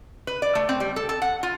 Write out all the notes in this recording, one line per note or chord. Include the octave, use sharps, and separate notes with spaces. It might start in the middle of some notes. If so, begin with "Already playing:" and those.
B4
D5
A3
C4
G3
A4
A4
F#5
F4